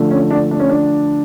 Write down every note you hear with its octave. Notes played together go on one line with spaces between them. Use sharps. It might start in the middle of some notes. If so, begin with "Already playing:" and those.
Already playing: D3 F3 A3
C#4
D4
D4
C#4
D4